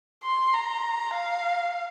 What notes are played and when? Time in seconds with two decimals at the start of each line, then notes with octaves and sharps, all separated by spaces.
0.24 C6
0.54 A#5
1.14 F5